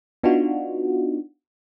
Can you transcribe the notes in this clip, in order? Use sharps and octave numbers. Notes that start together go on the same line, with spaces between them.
B3 D4 D#4 F4 F#4